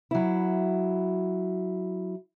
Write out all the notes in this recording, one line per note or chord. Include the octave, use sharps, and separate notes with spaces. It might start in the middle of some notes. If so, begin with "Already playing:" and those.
F#3 E4